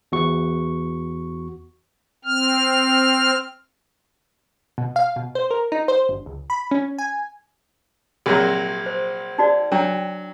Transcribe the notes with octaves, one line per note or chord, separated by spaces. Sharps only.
E2 F#4 C#6
C4 F6
B2
F5
B2
C5
A#4
D#4
C5
G1
C#2
B5
C#4
G#5
A#1 C3 F#3 F#4
C5
D#4 F#4 D5
F#3 D4 G5